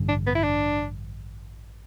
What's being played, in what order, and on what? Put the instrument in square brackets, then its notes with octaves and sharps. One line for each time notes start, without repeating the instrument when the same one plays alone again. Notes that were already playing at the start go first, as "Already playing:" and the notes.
Already playing: [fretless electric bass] A1 G2 D3 G3
[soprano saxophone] D4
B3
E4
D4